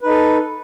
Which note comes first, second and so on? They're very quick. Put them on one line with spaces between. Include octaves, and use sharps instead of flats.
B4 D#4 A4